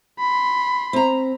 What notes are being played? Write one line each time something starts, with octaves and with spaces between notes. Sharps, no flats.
B5 C6
C4 A#5